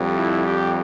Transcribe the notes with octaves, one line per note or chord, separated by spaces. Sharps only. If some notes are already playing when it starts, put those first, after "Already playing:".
Already playing: F2 D3 G3
E4
G4